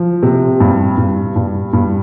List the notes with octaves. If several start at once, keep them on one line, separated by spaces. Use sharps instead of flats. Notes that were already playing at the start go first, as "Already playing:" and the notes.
Already playing: F3
C3
G2
G2
G2
G2